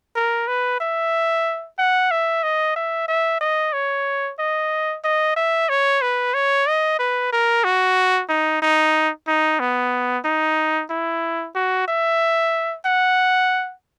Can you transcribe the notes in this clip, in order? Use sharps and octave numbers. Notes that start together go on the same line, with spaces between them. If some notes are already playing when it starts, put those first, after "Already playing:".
A#4
B4
E5
F#5
E5
D#5
E5
E5
D#5
C#5
D#5
D#5
E5
C#5
B4
C#5
D#5
B4
A#4
F#4
D#4
D#4
D#4
B3
D#4
E4
F#4
E5
F#5